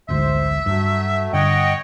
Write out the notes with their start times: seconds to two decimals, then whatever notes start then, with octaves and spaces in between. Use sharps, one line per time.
0.09 A1 D2 G#2 C5 E5
0.66 G2 F#3 A3
1.33 G2 D3 C#5 D#5 F#5 G5